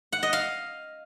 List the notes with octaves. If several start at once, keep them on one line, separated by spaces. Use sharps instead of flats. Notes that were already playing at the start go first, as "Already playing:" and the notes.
F#5
D#5
F5